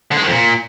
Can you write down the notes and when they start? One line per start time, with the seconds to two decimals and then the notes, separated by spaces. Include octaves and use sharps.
0.11 D3
0.17 G#3
0.22 D#3
0.27 F2
0.32 A#2